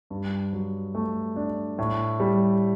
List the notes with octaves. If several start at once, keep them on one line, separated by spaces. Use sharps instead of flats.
G2
F#3
A3
D4
A2
G3